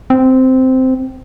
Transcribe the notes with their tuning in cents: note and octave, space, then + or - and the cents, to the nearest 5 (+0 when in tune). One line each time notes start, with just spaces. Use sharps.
C4 -10